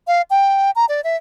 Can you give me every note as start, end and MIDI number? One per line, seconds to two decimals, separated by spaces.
0.07 0.22 77
0.30 0.71 79
0.76 0.85 82
0.89 1.01 74
1.04 1.16 76